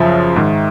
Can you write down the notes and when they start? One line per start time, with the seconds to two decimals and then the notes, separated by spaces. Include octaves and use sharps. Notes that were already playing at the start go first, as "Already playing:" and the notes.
Already playing: F#2 C#3 F3 E5
0.36 G#2 D#3